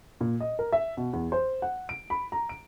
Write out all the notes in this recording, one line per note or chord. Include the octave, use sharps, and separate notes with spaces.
A#2
D#5
A#4
E5
B2
E2
C5
F#5
D7
B5
A#5
D7